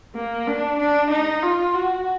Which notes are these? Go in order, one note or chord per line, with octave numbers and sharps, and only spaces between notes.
A#3
D4
D4
D#4
F4
F#4